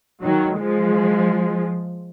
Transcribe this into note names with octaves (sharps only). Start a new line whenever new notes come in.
D#3 F#3
F3 G#3